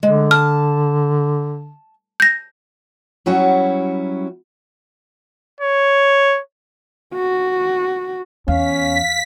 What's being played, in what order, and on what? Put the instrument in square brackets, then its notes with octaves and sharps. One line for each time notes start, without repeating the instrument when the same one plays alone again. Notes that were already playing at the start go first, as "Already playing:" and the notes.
[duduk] D3 [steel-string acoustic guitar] G#3
[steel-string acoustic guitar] A5 [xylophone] F6
[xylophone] G6 A#6
[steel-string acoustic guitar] F#3 G3 C#4 E4 F#4
[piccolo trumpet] C#5
[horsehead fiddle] F#4
[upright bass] E2 [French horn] C#4 [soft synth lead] F5 [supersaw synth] B6